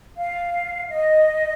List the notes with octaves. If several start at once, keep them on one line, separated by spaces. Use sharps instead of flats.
F5
D#5